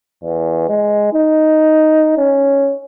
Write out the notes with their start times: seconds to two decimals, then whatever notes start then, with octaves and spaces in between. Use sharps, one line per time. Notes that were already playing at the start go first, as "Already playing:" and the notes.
0.23 E2
0.69 G#3
1.13 D#4
2.18 C#4